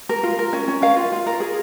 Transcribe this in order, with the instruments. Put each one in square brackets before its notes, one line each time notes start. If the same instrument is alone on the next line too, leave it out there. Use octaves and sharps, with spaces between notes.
[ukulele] A#4
F4
A#4
C#4
C#4
A#4 F5
F4
F4
A#4
G#4